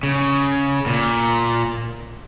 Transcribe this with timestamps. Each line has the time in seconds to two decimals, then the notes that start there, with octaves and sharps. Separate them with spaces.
0.03 C#3
0.86 A#2